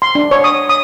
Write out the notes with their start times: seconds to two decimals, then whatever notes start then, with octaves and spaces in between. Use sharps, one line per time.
0.02 C6
0.15 D4
0.31 C#5
0.44 D#6
0.69 D#6